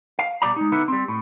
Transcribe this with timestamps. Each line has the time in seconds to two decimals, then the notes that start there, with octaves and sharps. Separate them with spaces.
0.19 F5
0.42 B2 G3 D5 A#5
0.56 G#3 D#4
0.72 D3 B3 D#4 E4
0.88 G3 C4
1.08 A2